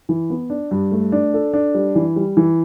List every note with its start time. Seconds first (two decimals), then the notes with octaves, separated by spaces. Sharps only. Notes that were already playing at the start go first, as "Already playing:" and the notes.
0.09 E3
0.30 B3
0.50 D4
0.71 G2
0.92 A3
1.12 D4
1.34 A4
1.54 D4
1.75 G3
1.95 E3
2.16 G3
2.37 E3